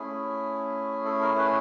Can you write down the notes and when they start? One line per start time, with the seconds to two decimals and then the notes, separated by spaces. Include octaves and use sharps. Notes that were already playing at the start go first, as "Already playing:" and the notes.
Already playing: A3 C#4 E4 G#4
1.05 A4
1.22 A#4
1.38 B4